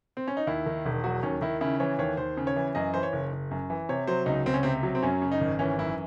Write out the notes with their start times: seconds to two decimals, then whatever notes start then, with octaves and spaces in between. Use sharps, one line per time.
0.17 C4
0.28 C#4
0.37 D#4
0.47 D#2 E4
0.66 D#3
0.85 E1
1.04 F#3 F#4
1.23 D#2 C#4
1.41 D#3 E4
1.61 C#3 E4
1.80 E3 C#5
1.99 D#2 C#5
2.17 D#2 C5
2.37 C#3
2.47 C#5
2.56 E3
2.75 F#2 D#5
2.94 E3 C5
3.03 C#5
3.13 F#1
3.32 F#1
3.51 F#2
3.70 E3
3.89 C3 C#5
4.07 F#3 C5
4.26 C#2 D#4
4.46 C#2 C4
4.54 C#4
4.63 C3 C4
4.83 F#3
4.95 C4
5.03 F#2 C#4
5.22 C#3
5.32 D#4
5.41 G#1
5.59 E3 C#4
5.79 F#2 E4